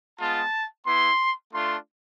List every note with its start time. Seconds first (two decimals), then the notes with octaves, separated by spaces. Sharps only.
0.19 G#3 B3 F4 A5
0.86 B3 E4 C6
1.54 A3 D4 F4 C6